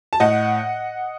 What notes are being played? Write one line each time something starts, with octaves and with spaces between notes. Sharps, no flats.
A5
A2 D#5 F#5